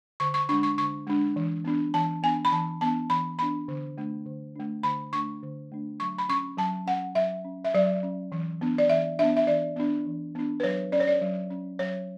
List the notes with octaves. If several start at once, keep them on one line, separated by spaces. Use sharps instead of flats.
D3 C#6
C#6
G#3 D4 C#6
C#6
D3 C#6
G#3 D4
E3
B3 D4
E3 A5
B3 D4 G#5
B5
E3 A5
B3 D4 A5
E3 B5
B3 D4 B5
D3
A3 D4
D3
A3 D4
D3 B5
A3 D4 C#6
D3
A3 D4
F#3 C#6
B5
C#4 C#6
F#3 A5
C#4 F#5
F#3 E5
C#4
E5
F#3 D5
C#4
E3
B3 D4
D5
E3 E5
B3 D4 E5
E5
E3 D5
B3 D4
E3
B3 D4
B4
F#3 C#5
C#4 D5
C#5
D5
F#3
C#4
F#3 C#5